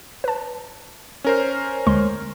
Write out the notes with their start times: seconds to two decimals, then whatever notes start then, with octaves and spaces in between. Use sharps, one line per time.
0.24 B4 A5
1.24 C#4 A#4 C5
1.87 D2 G#3 C6